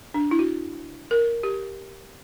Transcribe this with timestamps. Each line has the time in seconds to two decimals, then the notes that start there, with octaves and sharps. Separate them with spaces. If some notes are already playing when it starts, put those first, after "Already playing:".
0.14 D4
0.31 E4
0.39 F#4
1.11 A#4
1.43 G4